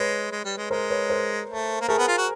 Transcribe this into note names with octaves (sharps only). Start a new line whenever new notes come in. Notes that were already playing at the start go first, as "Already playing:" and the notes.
Already playing: G#3 B4 C#5
G#3
G3
G#3
G#3 A#4 C5
B4 C#5
A#4 C5
A3
A#3
A3 G#4 A#4
B3
F4
F#4